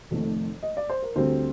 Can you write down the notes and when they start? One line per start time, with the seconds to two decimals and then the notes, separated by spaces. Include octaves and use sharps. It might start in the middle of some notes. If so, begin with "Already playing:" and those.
0.11 F1 F2 D#3 A3
0.63 D#5
0.77 D5
0.90 C5
1.03 A#4
1.16 D2 D3 G3 C4 C5